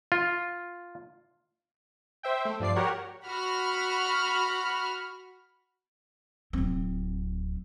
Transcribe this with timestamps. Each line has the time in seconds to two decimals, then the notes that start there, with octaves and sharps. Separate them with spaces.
0.12 F4
2.23 C5 E5 G5
2.45 A3
2.60 G2 F3 D5 C7
2.76 F#4 G4 A#4 C#5 F#5
3.27 F#4 B5 F6
6.53 D1 C4